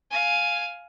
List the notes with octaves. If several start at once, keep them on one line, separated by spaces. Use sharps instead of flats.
F5 G#5